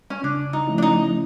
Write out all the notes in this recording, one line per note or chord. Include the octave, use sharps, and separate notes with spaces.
C#4
C#3 D4
D#4
F3 A3 C#4 E4
D4
D#4